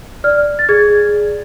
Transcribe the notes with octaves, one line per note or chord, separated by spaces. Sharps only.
D5 F6
A6
G#4 G#6